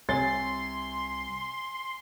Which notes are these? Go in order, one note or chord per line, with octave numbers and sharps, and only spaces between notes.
C2 C3 C#5 G#5 C6 A6